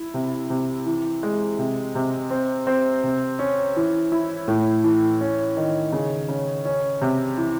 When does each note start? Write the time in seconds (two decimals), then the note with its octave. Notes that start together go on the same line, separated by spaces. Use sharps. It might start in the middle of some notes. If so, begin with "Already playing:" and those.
Already playing: E4
0.14 C3
0.50 C3
0.86 E3
1.23 G#3
1.59 C3
1.95 C3
2.30 C4
2.67 C4
3.04 C3
3.39 C#4
3.76 E3
4.12 E4
4.48 A2
4.84 E3
5.21 C#4
5.57 D#3
5.93 C#3
6.29 C#3
6.65 C#4
7.01 C3
7.37 E3